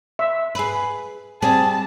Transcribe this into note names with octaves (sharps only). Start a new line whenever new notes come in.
E5
G#4 B4
G3 C4 G#4 A5